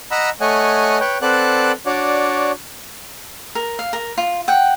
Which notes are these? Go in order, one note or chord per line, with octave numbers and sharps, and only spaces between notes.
D#5 F#5 A#5 B5 E6
A3 C#5 D#5 F#5 G#5
B4 C#5 G5
C4 A4 B4 D5 F#5 F#6
D4 F#4 C#5 D5
A#4
F5
A#4
F4
F#5 G5